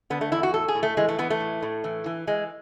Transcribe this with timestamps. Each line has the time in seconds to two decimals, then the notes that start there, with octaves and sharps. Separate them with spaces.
0.10 D3 B3
0.21 A3
0.32 E2 E4
0.43 F#4
0.54 A2 A4
0.68 G#4
0.75 A2
0.83 A3
0.97 E3 G#3
1.08 A3
1.18 E3 B3
1.30 A3
1.40 A2
1.62 A2
1.84 E3
2.06 E3
2.27 E3 G#3